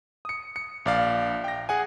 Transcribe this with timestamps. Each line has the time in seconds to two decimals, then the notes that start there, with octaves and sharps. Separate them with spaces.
0.25 D#6 C#7
0.56 C#7
0.86 A#1 D5 F5
1.44 G5 A#6
1.69 G#4 F#5 G#5